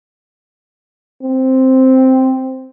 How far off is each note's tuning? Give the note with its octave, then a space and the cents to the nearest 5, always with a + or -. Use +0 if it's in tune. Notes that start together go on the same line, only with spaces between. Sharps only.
C4 +0